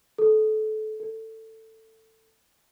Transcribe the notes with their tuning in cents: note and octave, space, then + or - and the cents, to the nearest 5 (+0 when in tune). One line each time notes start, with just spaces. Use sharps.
A4 -25
A4 +15